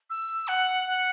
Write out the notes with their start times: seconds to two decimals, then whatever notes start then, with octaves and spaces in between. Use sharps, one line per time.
0.10 E6
0.48 F#5
0.87 F#5